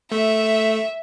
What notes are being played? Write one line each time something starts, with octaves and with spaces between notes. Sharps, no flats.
A3 E5